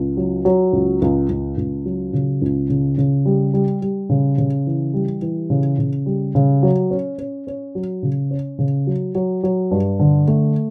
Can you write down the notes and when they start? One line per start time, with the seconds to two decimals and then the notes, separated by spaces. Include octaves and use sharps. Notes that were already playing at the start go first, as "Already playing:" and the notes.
Already playing: C#2
0.17 F#3
0.45 F#3
0.73 C#2
1.02 C#2
1.29 C#2
1.57 C#2
1.85 F#3
2.13 C#3
2.42 C#2
2.69 C#3
2.98 C#3
3.26 G3
3.54 G3
3.82 G3
4.09 C#3
4.38 C#3
4.67 E3
4.94 G3
5.22 E3
5.50 C#3
5.78 C#3
6.06 G3
6.35 C#3
6.63 F#3
6.91 C#4
7.18 C#4
7.47 C#4
7.75 F#3
8.03 C#3
8.31 C#4
8.58 C#3
8.87 F#3
9.15 F#3
9.43 F#3
9.71 G2
9.99 D3
10.28 A3